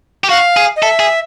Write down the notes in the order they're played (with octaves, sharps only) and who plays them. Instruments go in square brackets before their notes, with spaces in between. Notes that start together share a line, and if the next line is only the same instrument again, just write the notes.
[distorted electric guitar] G4
[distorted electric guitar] F#4 [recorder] F5
[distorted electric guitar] G#4
[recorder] D#5
[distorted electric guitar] A4 [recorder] E5
[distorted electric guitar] G#4